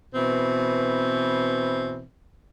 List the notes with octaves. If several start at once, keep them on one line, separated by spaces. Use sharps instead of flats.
B2 E3 C4